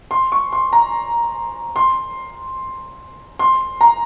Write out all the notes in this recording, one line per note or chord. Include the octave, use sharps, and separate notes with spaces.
C6
C#6
C6
A#5
C6
C6
A#5